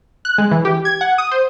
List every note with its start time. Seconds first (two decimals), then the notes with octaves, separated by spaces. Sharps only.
0.25 F#6
0.38 G#3
0.51 E3
0.65 G4
0.85 G#6
1.01 F#5
1.18 D#6
1.31 C5